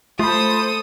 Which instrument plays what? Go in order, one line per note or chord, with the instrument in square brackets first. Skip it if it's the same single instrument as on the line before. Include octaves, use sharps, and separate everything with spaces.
[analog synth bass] A3 [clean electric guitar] F4 B5 [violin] A4 D#6 [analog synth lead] C5